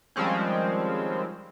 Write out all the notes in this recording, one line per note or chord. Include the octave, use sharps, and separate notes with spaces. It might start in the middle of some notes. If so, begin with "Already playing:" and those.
D#3 F3 G3 G#3 C4 C#4